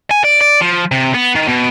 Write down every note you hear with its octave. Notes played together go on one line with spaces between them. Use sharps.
G#5
D5
D5
F3
C3
B3
D#3
B2